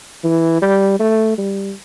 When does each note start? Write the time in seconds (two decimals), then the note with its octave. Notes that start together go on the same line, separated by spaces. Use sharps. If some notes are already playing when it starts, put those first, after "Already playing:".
0.24 E3
0.62 G3
0.99 A3
1.38 G3